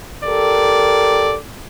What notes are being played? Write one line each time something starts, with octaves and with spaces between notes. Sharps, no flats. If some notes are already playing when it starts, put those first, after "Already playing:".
G4 A4 A#4 D5